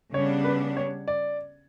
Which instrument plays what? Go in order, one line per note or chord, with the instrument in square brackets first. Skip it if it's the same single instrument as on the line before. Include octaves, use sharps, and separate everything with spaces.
[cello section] C#3 G3 B3 D4 [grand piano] C#5
[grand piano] B4
C#5
D5